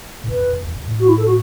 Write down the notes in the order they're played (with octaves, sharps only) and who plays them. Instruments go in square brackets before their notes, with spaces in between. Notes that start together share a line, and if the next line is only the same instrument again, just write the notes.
[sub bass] A2
[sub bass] F#2 [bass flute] B4
[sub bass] F#2
F#2
E2
F#2
A2
[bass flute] F#4
E4
A4
F#4